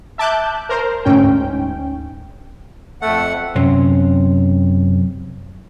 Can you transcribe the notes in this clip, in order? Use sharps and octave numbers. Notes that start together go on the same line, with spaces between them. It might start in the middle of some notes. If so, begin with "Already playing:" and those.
E5 A5 D6 F#6 G6
A#4 C5
D2 G#2 C#4 G5
F2 A3 F#5
F#2 C3 C4 C#4